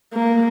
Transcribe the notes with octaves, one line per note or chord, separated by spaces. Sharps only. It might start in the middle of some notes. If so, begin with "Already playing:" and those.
A#3